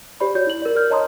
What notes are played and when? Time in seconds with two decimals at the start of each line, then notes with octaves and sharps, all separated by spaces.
0.20 G4 C5 D5 B5
0.35 F#4 C#5 D5 G6
0.47 E4 F#7
0.62 A#4 D5
0.75 A#4 D5 F6 G6
0.90 C#5 D#5 A5 A#5 C6 D#6